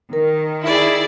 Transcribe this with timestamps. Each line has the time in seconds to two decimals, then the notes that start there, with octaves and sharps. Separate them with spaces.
0.13 D#3 A#4
0.66 E4 G#4 D5